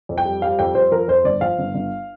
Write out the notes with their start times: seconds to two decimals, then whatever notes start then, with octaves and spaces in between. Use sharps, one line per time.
0.09 F2
0.18 G5
0.25 G3
0.42 G3 F5
0.59 F2 G5
0.75 F2 C5
0.92 F3 A#4
1.08 F2 C5
1.24 G1 D5
1.41 F3 F5
1.59 G1
1.75 G1